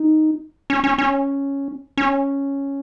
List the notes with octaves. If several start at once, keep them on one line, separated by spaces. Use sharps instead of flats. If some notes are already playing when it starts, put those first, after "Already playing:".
Already playing: D#4
C#4
C#4
C#4
C#4